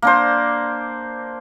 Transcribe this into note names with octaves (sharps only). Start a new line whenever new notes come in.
A#3 D4 C5